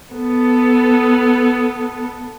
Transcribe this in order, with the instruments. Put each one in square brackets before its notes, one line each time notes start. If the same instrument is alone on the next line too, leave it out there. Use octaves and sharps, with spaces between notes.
[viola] B3 A4